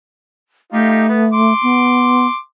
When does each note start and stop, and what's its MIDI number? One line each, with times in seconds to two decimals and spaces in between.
0.73 1.53 57
0.73 1.05 63
0.73 1.05 65
0.73 1.05 67
1.09 1.25 59
1.33 2.36 84
1.33 2.36 86
1.63 2.27 59